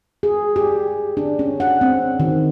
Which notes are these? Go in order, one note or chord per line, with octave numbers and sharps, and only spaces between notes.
G#4
G4
D4
C#4
F#5
C4
D#3